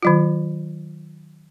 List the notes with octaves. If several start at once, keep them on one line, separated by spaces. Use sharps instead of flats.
D#3 F#3 F4